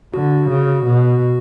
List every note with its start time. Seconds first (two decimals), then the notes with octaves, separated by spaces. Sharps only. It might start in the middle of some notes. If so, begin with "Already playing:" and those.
0.14 D3 F#4
0.50 C#3
0.85 B2